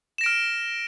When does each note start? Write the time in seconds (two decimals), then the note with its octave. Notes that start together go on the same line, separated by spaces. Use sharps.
0.18 E7
0.21 A#6
0.24 D7
0.26 F6